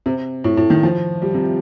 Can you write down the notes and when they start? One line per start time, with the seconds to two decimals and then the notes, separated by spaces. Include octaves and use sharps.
0.06 C3
0.44 A2
0.57 A2
0.70 D#3
0.83 F3
1.22 G3
1.34 C3